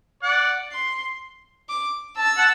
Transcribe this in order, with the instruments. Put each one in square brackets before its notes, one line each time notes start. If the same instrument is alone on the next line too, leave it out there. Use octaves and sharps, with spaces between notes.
[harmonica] D5 F#5
[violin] C6
D6
[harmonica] A5 [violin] E6
[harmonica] F#5 A5